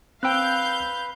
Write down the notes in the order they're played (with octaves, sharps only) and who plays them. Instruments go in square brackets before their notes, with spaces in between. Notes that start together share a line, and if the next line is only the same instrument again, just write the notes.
[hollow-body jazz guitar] C4 G5 [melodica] B4 [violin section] F5 G6 [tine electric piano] E6 F#6